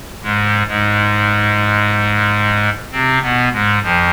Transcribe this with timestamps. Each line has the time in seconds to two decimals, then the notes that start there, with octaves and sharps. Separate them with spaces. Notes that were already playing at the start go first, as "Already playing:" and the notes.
0.22 G#2 G#3
0.67 G#2 G#3
2.92 C3 C4
3.22 B2 B3
3.52 G#2 G#3
3.81 F2 F3